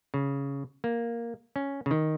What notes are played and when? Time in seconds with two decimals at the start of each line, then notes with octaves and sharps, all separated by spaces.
0.14 C#3
0.84 A#3
1.56 C#4
1.86 C#3
1.91 D#3